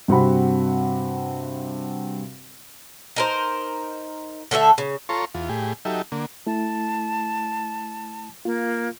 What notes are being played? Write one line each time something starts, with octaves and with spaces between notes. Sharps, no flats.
G2 C3 C4 F#4 F#5 B5
D#4 A#4 C5
D3 A3 A4 E5
C#3
F4 A4 C#5 A#5 C6 C#6
E2 F4
A2 G4 G#4
F#3 D#4 G4 A4 E5
D3 A#3
A3 E4 A5
A#3 F4